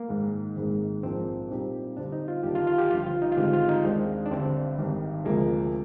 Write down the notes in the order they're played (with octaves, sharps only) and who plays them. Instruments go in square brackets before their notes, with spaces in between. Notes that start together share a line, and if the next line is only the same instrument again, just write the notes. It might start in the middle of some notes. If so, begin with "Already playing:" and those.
Already playing: [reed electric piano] A#3
[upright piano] G#2 D#3 G#3
G#1 G#2 D#3 G#3
[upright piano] A#1 G#2 F3 A#3 D4 [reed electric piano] C4
[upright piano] A#2 G3 C4 D#4 G4
[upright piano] G2 D3 G3 C4 [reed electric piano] D4
[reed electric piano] D#4
F4
[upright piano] G1 G2 D#3 A#3 D4 [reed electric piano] G4
[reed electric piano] F4
F4
G4
[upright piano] G1 G2 F3 [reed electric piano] F4
[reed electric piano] F4
D#4
F4
[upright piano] G#1 G2 D3 G#3 C4 [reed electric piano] G4
[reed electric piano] F4
D#4
[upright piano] D#2 D#3 G#3 C4 [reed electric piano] D4
[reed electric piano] D4
[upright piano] G1 G2 D3 [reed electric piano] C4
[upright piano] G#1 G2 D#3
[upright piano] D2 C3 F3 A#3 [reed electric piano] G#3